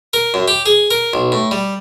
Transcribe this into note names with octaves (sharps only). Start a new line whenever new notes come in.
A#4
F#2
G4
G#4
A#4
B1
A2
G3